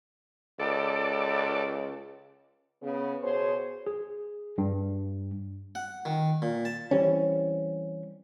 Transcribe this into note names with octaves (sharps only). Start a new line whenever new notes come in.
C#2 A4 D5
C#3 B3
B2 G#4 C5 C#5
G#4
G2
F#5
D#3
A#2
A5
E3 G3 C4 C#4